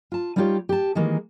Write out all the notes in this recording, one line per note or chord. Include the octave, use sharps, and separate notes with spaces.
F4 A5
G3 B3 D#4 F4 G4 C#5
G4 A5
D#3 E3 G#3 A#3